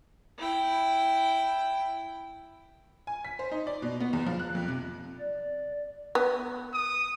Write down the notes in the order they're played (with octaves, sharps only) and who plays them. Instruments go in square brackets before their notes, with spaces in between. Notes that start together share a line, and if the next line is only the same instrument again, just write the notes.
[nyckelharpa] E4 G5
[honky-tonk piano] G#5
B6
C5
D#4
D5
B2
B3
E2
F3
F#6
F2
C3
[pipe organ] D5
[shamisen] B3
[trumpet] D#6